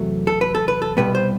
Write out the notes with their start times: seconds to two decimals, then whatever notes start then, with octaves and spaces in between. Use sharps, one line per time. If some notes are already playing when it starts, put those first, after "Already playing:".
Already playing: E2 C3 F#3 A3
0.27 A4
0.41 B4
0.55 A4
0.68 B4
0.82 A4
0.97 C2 B2 G3 B3 B4
1.15 C5